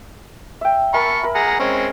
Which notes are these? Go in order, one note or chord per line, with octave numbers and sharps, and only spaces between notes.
E5 G5
A#4 E5 G#5 A5 B5 C#6
A#4 B5
G#4 F#5 A#5
G#3 C4 C#4